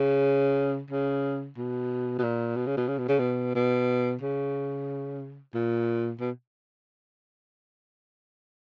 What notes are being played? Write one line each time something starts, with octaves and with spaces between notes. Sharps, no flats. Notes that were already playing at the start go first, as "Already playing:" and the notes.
Already playing: C#3
C#3
B2
B2
A#2
B2
C#3
B2
C#3
B2
C#3
B2
B2
C#3
A#2
B2